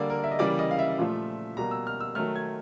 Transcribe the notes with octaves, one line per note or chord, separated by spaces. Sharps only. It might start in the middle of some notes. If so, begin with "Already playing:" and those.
Already playing: D3 G3 A#3 D5
A#4
E5
D#5
C#3 E3 G3 A#3 D5
D#5
F5
E5
A#2 F3 A3
B2 G3 A#3 A#5
E6
F6
E6
D#3 F#3 A3 F6
G#6